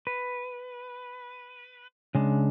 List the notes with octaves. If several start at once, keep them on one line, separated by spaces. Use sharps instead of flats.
B4
C#3 G#3 D4